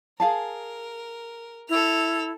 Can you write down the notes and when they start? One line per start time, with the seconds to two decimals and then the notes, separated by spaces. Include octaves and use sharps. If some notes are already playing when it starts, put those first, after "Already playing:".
0.20 G#4 A#4 F5 A5
1.69 E4 A4 F7